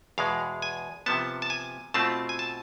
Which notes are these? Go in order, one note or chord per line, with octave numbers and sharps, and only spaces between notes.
E2 B2 G#3 F5
G#5
C3 F3 B3 A5
A5
G#5
B2 A3 C4 F4 A5
G#5
A5